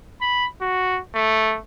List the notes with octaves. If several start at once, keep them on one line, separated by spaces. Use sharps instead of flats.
B5
F#4
A3